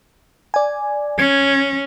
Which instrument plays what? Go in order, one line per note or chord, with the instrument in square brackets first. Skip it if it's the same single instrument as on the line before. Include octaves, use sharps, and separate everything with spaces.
[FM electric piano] D5 G#5
[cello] C#4 [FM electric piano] G#6